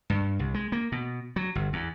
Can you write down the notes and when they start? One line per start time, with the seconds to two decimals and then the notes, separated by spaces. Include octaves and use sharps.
0.10 G2
0.39 C2
0.54 G#3
0.72 A#3
0.92 B2
1.36 F#3
1.55 G1
1.73 E2